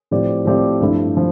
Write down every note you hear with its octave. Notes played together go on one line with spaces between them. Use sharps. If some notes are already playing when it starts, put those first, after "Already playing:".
A2 F3 C4 G4 D5
A2 F3 C4 G4 D5
G2 F3 A3 E4
F3